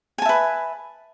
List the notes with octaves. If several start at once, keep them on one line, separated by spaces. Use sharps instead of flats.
B4 E5 G#5 A5